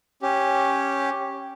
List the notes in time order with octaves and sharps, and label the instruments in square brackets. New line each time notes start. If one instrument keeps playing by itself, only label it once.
[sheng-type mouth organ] C#4 G4